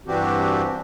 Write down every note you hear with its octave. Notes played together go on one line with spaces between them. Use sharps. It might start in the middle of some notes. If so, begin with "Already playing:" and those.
G2 E3 C4 D4 F#4 G4